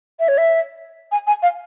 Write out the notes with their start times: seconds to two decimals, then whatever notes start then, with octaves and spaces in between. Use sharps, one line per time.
0.20 E5
0.28 C#5
0.38 E5
1.12 G#5
1.27 G#5
1.43 F5